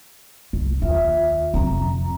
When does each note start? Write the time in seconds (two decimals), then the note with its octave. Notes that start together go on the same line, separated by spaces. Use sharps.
0.53 C2
0.82 D#2 F4 E5
1.54 F2 C3 C4 A#5